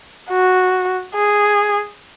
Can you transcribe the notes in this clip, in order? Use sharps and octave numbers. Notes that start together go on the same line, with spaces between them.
F#4
G#4